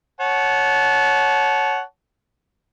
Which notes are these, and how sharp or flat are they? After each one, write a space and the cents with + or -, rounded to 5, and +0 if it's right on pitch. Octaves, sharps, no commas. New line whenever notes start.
C#5 +0 F#5 +0 A5 -25